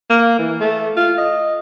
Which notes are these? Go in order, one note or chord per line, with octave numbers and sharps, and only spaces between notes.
A#3
E3
A3
F4
D#5